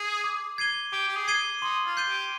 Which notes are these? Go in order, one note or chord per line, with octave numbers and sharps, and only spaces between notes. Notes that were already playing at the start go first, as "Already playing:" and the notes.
Already playing: G#4
D6
G#6 C7 D#7 G7
G4 D6
G4
G#4
G#6 C7 D#7 G7
D#4 C6
F4
G6 C7 D#7 G7
G4